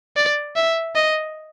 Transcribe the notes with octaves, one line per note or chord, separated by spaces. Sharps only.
D5
E5
D#5